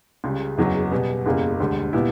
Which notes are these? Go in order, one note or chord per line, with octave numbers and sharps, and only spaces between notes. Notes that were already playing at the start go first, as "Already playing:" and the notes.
C#2 C#3 G3
F#1 E2 C#3 F#3
B2 G3 B3
F#1 E2 C#3 G3 A#3
E1 D2 D3 G3
A#2 G3 B3 E4